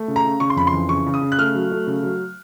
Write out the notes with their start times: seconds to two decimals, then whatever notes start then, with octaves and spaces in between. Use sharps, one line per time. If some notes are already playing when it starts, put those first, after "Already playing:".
Already playing: A3
0.08 C#3
0.16 A#5
0.24 C#3
0.40 C#3 C#6
0.50 C6
0.56 F2 B5
0.67 C6
0.73 E3
0.89 C#3 C#6
1.06 C#3
1.14 D#6
1.21 C#3
1.32 F#6
1.38 A3 F6
1.55 F#3
1.71 A3
1.87 C#3
2.03 F#3